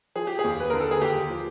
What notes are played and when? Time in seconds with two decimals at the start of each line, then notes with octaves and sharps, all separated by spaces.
0.15 F3 G#4
0.27 G4
0.39 G#4
0.44 D#2
0.60 B4
0.70 D3 A#4
0.80 A4
0.91 G#4
1.01 D#2 G4
1.30 F3